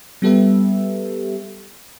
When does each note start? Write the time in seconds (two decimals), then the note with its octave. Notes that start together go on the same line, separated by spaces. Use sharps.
0.22 G3 B3 G4 A4 B4 E5